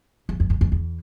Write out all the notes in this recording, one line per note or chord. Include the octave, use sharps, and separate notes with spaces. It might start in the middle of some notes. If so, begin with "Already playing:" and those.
E2
F2
F#2
F2
E2